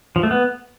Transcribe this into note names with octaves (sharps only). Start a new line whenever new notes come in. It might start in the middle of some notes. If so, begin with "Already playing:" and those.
F3
A3
B3